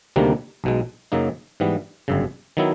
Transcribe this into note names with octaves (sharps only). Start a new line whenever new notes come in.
D2 C3 D#3 G3 A#3
B1 B2 G#3
F#2 C#3 F#3 A#3 D#4
G#2 E3 G3 B3
G1 F#2 C#3
D#3 F#3 B3 E4